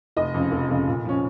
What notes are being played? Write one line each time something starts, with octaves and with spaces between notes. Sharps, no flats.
F1 D#5
F2 C#3 F3
F1
F2 C#3 F3
A#2
F3 C#4